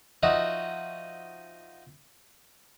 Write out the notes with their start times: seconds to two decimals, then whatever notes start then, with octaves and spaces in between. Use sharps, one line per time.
0.23 F3 D#4 F#4 D#5 E5